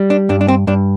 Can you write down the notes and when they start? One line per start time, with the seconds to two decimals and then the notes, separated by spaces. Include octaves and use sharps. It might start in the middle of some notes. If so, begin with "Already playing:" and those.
Already playing: G3
0.10 D4
0.29 G2 D4
0.41 D4
0.48 C4
0.67 G2 D4